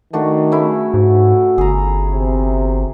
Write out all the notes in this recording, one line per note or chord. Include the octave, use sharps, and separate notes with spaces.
D#3 A3 D4 F#4
C#3 A3 E4
G#2 F#4
G1 G#4 A#5
C3